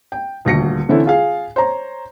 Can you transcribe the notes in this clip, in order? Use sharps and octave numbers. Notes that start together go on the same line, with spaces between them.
G5
D#1 D2 A#6 C#7
D3 E3 C4 C#4 E4 A4
F4 G#4 F5
C5 C#5 A#5